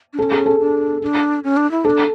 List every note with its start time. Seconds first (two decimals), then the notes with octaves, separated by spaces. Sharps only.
0.13 D4
0.18 C#4 A4
0.31 G#4
0.46 A4
0.60 D4
1.02 D4
1.44 C#4
1.57 D4
1.71 E4
1.85 D4 A4